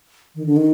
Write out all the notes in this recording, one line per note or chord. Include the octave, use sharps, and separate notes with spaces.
D#3
D3
D#3